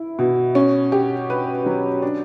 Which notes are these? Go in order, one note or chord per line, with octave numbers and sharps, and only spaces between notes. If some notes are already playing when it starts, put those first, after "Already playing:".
Already playing: E4
B2
C#4
G4
B4
F#3
D4